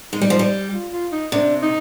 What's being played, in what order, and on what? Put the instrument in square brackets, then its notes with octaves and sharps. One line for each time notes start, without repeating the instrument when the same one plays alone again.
[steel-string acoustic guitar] G#3 [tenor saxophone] D#4
[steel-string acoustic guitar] G3
F3
G3
[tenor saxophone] F4
F4
D#4
[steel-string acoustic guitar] C3 [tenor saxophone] D4
[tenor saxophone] D#4